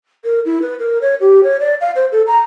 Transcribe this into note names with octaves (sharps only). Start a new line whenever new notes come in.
A#4
E4
B4
A#4
C#5
G4
C#5
D5
F5
C5
A4
A#5